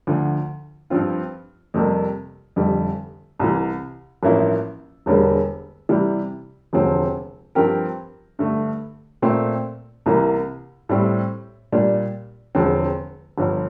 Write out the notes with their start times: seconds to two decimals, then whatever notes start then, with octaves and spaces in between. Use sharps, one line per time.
0.07 D2 D3 F3
0.90 G2 F3 C4 F4
1.74 F2 C3 G3 A#3
2.56 F1 F2 D3 G3
3.40 C2 C3 E3
4.23 A1 G2 F3 A#3 E4
5.06 E1 E2 D3 G3 A#3
5.89 C3 E3 G3
6.73 E1 D2 C3 F3 C4
7.55 G2 F3 C4 G4 A#4
8.39 G2 D3 A3
9.22 A#2 A3 C4
10.06 C2 C3 E3 A#3
10.89 A2 G3 C4
11.72 A#2 G3 D4
12.55 E1 E2 D3 F3 C4
13.38 G1 G2 F3